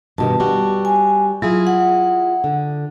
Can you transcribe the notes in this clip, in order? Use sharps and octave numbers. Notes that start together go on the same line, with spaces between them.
G2 B2 D#3 A5
G3 F#4
G#5
F#3 E4 F4 G#4
F#5
D3